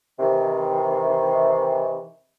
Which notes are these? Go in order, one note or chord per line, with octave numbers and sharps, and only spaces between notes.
C3 D#3 E3